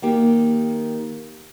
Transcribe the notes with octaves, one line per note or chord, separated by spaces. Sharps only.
D#3 A#3 G4